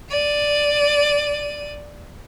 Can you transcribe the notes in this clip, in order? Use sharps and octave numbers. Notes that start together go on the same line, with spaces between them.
D5 D#7